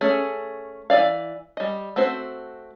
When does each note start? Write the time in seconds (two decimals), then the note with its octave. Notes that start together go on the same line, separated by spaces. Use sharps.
0.01 A3 C#4 G#4
0.90 E3 D#4 D5 F5
1.57 G3 D#5
1.96 A3 C4 F#4 C5